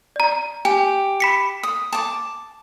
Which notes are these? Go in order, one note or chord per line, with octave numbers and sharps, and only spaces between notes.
D5 A#5
G4 G#5
B5 B6 C#7
D#6
A5 D6